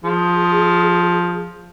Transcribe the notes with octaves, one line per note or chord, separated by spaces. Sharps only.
F3 G#4